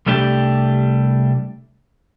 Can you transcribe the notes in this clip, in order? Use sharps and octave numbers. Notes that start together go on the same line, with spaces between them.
C2 G3 A3 D4 G4